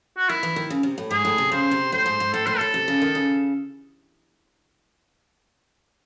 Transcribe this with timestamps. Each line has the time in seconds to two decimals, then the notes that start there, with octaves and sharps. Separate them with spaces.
0.18 F#4
0.29 D#3 E4
0.43 E3
0.56 D#3
0.70 C#3
0.83 C3
0.98 A2
1.11 G#2 G#4
1.25 A2
1.38 C3
1.52 C#3 C5
1.71 C3
1.92 A2 C5
2.06 G#2
2.20 G#2
2.33 A2 A4
2.46 A2 C5
2.57 A2 A4
2.74 C3
2.88 C#3
3.02 D#3
3.15 C#3